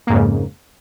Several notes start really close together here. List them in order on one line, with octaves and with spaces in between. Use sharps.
A#3 G#2 F2 C#3